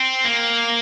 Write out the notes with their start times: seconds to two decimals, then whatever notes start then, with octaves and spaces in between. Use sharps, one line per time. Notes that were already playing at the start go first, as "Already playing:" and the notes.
Already playing: C4
0.25 A#3